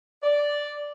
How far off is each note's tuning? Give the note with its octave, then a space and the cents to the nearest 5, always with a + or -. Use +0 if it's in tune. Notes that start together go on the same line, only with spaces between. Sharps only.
D5 -5